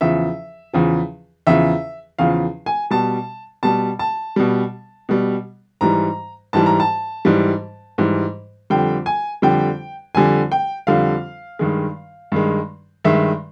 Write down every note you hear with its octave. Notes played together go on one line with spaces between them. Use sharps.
E2 C#3 F3 E5
E2 C#3 F3
E2 C#3 F3 E5
E2 C#3 F3 F5
G#5
B2 G3 A5
B2 G3 A5
A5
B2 G3
B2 G3
G#2 E3 G3 A#5
G#2 E3 G3 A5
A#5
A5
G#2 E3 G3
G#2 E3 G3
F2 D3 G3 G5
G#5
F2 D3 G3 G5
F2 D3 G3 G#5
G5
F2 D3 G3 F5
G2 D#3 G#3
G2 D#3 G#3
G2 D#3 G#3 E5